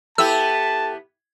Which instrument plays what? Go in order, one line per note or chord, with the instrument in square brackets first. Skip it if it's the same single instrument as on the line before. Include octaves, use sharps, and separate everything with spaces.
[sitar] B3 E4 G4 [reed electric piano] A4 G5 [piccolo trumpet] A5 [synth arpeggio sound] E6